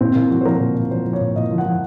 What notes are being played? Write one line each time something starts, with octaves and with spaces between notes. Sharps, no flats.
A#2 C4
A#2 A#3
F3 F#4
C5
F3 A#4
A#2
A#2
F3 C5
F3
C#5
A#2
A#2 D#5
F3
F#5
F3